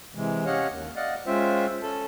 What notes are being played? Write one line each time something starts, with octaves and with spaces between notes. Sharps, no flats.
C3 E3 G#3
C#4 G4 C#5 D#5 F5 F#5
D#2
D5 D#5 F5 F#5
G#3 C#4 F4 C5 E5 G5
C#4 A4 A5